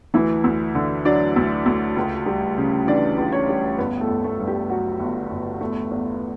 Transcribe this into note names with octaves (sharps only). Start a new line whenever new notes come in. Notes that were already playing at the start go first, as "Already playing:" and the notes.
D2 E3 E4
D2
D3
F#3 D4 D5
D2
D2
C#2
G3
C#3
E3 D4 D5
C#2
C#4 C#5
G3
G1 B3 B4
A3 A4
G1
A3 A4
G2
G3 G4
F#3 F#4
G1
G1
E2 A3
E2